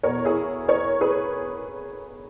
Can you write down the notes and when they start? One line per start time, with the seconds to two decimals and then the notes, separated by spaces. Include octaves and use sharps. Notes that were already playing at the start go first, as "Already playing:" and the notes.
0.03 E2 B2 A#4 C#5
0.25 E4 G#4
0.68 A#4 C#5
1.01 G#4 B4